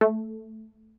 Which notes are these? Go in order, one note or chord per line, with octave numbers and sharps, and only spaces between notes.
A3